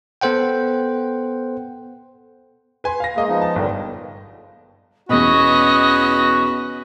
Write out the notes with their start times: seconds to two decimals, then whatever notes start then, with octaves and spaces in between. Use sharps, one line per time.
0.21 B3 A4 C5 F#5 G5
2.84 B4 G#5 C6
3.00 F5 A#6
3.16 G#3 A#3 D#5
3.29 F3 B3 D#4
3.41 A5
3.56 G1 A#2 D3 G3
5.09 E2 B2 C#4 F#4 B4 D#5